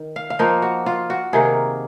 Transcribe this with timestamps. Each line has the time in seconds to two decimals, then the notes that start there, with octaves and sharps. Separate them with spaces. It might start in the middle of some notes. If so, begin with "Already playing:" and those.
Already playing: D#3
0.16 F5
0.30 F5
0.39 F3 A#3 D#4 D#5
0.62 F#4
0.86 F4
1.10 F#4
1.33 C3 D#3 A#3 G#4